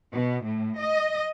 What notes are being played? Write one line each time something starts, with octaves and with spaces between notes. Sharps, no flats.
B2
A2
D#5